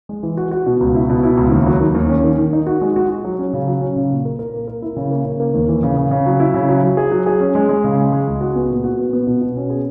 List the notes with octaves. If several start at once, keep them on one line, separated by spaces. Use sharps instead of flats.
G#3
E3
F#4
F#4
B2
C#2
E4
B2
E4
C#2
D#2
F#3
D#3
D#2
C#4
D#3
D#3
D#4
F#4
G#3
F#4
F#4
F#3
C#4
C#3
F#3
C#4
C#3
A#2
A#4
A#4
A#3
A#4
E4
C#3
A#3
C#3
A#3
D#2
E3
C#3
C#3
C#3
F#3
E4
C#3
F#3
F#3
G#4
F#3
G#4
C#4
G#3
G#3
C#3
G#3
G#3
C#2
F#4
B3
A#2
F#4
B3
B3
B2
B2
C#4
G#4